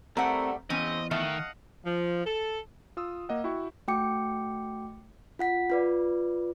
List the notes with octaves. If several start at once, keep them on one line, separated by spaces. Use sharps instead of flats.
G3 A3 C4 A#4 F#5
E2 C#3 C4 C#4 D#5
D#3 A3 D#5 F5 F#5
F3
A4
F4 D#6 E6
A#3 D#5 F#5
E4 F#4 G5 C#6
A3 F#4 G5 D6 C#7
F4 F#5 B6
F4 B4 D5